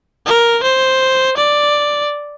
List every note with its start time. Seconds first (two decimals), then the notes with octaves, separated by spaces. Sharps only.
0.26 A#4
0.63 C5
1.37 D5